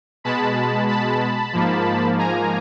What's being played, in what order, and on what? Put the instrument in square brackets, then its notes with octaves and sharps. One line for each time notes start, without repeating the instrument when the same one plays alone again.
[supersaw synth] B2 G#3 A5 B5
A5 B5
G#2 F3 A#3
G#5 A#5